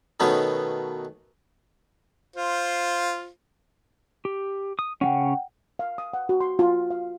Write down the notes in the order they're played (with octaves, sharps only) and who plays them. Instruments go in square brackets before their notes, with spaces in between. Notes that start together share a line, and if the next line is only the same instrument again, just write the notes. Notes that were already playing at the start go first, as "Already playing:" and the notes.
[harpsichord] B2 D#3 A3 B3 C#4 D#4
[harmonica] F4 C5
[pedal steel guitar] G4
D#6
[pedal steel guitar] C#3 G3 C#4 [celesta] F#5 G5
[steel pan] F5
D#6
F#5
F#4
C6
F4
F5